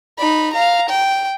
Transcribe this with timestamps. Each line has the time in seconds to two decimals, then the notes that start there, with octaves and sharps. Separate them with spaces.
0.18 D#4 B5
0.53 F5 A#5
0.89 G5